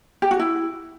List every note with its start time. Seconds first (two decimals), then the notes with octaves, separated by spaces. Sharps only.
0.22 G4
0.31 F#4
0.39 E4